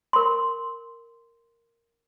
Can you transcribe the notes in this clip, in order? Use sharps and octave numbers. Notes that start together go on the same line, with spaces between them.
A#4 C6